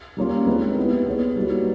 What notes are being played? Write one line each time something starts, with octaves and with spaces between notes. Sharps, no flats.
G3 A#3 C#4 F4
G#3 C4 D#4 G#4 B4
B3 E4 G4
B3 E4 G#4 C#5
G3 A#3 D#4 F#4 B4